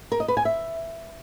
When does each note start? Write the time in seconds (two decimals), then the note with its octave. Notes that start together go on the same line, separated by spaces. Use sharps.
0.12 A#4
0.20 D#5
0.28 B4
0.37 G#5
0.45 E5